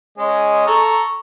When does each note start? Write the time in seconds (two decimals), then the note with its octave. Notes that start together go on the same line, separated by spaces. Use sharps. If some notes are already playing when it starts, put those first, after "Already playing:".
0.18 G#3 C#4 D#5
0.66 A4 A#5 C#6